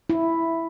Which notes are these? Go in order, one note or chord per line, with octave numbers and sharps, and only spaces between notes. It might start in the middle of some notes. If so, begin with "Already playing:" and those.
E4